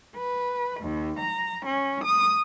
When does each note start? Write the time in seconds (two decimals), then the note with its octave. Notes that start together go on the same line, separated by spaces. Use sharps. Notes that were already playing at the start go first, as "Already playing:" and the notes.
0.15 B4
0.80 D#2
1.18 A#5
1.65 C#4
2.04 D#6